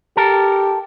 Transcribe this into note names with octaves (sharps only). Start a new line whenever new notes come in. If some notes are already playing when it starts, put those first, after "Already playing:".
G4 A4 A#4